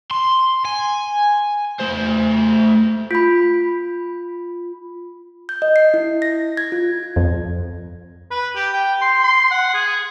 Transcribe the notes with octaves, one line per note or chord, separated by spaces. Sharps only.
C6
G#5
A3 C5
F4 B5
G6
D#5
C7
E4
A#6
G#6
F4
F2
B4
G4
G5
C6
C6
F#5
G#4